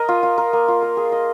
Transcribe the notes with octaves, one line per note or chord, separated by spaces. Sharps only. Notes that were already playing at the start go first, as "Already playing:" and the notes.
Already playing: A#4 D#5
F4
F4
A#4
A#3
F4
A#4
G#4
D#5